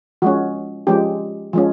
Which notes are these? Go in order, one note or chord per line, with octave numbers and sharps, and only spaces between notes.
F3 G#3 C#4 F#4
F3 G#3 C#4 G4
F3 G#3 C#4